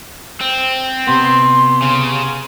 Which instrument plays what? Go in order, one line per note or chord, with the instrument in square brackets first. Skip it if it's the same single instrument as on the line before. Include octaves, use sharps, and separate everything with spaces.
[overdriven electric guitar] C4
[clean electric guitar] C3 B3 [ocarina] C6
[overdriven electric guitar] C#3